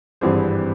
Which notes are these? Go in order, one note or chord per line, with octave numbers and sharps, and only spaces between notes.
G#1 G2 E3 G3 C4 G#4 C5